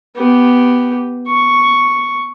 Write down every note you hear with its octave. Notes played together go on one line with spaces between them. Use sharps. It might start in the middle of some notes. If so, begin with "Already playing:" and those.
B3 G4
C#6